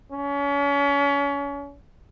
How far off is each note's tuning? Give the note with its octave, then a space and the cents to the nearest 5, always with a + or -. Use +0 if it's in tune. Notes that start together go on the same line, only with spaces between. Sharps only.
C#4 +35